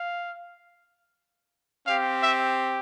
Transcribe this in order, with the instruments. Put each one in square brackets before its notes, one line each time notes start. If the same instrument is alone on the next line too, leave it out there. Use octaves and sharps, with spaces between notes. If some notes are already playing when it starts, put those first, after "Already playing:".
Already playing: [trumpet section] F5
C4 G4 F5
E5